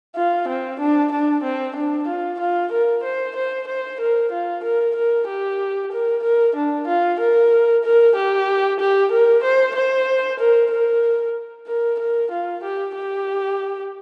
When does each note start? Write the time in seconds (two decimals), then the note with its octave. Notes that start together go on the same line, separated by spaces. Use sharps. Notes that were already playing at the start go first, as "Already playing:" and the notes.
0.15 F4
0.48 C4
0.79 D4
1.11 D4
1.43 C4
1.76 D4
2.07 F4
2.40 F4
2.72 A#4
3.03 C5
3.36 C5
3.67 C5
4.00 A#4
4.32 F4
4.63 A#4
4.96 A#4
5.28 G4
5.92 A#4
6.23 A#4
6.55 D4
6.87 F4
7.19 A#4
7.84 A#4
8.16 G4
8.79 G4
9.11 A#4
9.43 C5
9.75 C5
10.39 A#4
10.71 A#4
11.67 A#4
11.99 A#4
12.31 F4
12.63 G4
12.95 G4